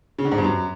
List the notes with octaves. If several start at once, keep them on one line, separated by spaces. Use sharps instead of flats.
C#3
D3
G#2
G2
F#2